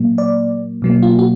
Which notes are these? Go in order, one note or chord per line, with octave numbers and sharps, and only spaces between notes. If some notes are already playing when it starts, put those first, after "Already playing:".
Already playing: A#2 F#3 A#3
D5
B2 F#3 A#3
F4
F#4